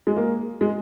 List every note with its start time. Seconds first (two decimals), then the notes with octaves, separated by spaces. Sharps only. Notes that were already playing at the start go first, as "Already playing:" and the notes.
0.07 G#3
0.17 A#3
0.61 G#3